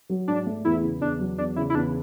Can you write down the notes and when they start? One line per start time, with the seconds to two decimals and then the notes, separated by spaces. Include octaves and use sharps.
0.10 F#3
0.28 G#2 D4
0.47 A3
0.65 E2 E4
0.83 C#3
1.01 E2 D4
1.19 F#3
1.38 E2 D4
1.56 C#3 E4
1.70 E4
1.75 E2 D4